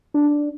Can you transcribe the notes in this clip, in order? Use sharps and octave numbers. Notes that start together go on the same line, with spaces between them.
D4